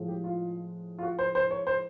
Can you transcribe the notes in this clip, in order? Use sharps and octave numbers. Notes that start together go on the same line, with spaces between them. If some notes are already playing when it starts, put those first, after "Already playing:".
Already playing: A2 F3 G#3
G4
F4
F4
F#4
C5
C5
C#5
C5